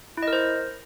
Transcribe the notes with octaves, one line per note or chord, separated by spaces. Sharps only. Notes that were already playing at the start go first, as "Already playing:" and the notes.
E4
D#5
A#4
C5